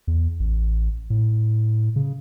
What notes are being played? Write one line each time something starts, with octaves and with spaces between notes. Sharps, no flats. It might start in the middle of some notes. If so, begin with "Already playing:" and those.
E2
A1
A2
C#3